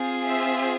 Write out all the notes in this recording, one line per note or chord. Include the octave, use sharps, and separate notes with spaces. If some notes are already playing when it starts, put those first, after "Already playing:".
Already playing: C4 F4 G#4
E5